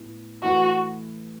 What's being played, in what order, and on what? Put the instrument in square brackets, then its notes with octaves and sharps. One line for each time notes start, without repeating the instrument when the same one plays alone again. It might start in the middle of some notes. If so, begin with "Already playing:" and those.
Already playing: [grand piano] A2 B3
[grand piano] E3 A3 E4 B4 [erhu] F#4